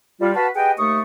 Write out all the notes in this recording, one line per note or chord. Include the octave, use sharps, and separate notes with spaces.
G3 F4
F#4 B4 F5 A5
G4 G#4 B4 D#5 F#5 G5
D#2 A3 C#6 D#6